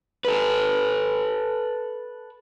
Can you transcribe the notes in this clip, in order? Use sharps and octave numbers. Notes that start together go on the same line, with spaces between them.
A4 B4